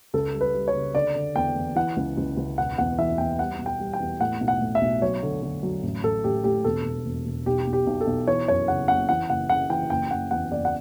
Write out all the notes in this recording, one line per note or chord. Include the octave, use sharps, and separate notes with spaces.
C#2 A4
G3
B4
G3
C#5
C#3
D3 D5
D3
E2 G5
E2
E3 F#5
C#2
C#2
C#2
E1 F#5
E2 F#5
E3 E5
E2 G5
G3 F#5
B2
G5
G3
G5
E2
A2 F#5
B1
F#5
A2
E5
B1
F#3 C#5
D3
D3
F#3
A1
A1 A4
A1 G4
A2 G4
E1 A4
E1
E1
E1
B1 G4
B1
G4
B1
A4
B1
E3 C#5
F#2 C#5
C#3 F#5
F#1 F#5
E3 F#5
F#1 F#5
C#3 F#5
E3 G5
F#1 G5
F#1 F#5
E2 F#5
F#1 D5
F#5